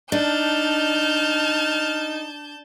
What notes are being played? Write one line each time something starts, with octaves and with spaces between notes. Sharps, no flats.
D4 D#4 A5 F6 G6